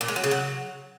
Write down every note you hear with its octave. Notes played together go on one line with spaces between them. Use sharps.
A#2
G#3
F#3
C#3
F#3